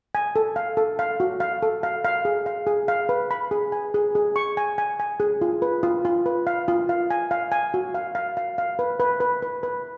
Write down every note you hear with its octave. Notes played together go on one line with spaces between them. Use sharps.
G#5
A4
F5
A4
F5
F#4
F5
A4
F5
F5
G#4
F5
G#4
F5
B4
B5
G#4
G#5
G#4
G#4
C#6
G#5
G#5
G#5
G#4
F4
B4
F4
F4
B4
F5
F4
F5
G#5
F5
G#5
F#4
F5
F5
F5
F5
B4
B4
B4
B4
B4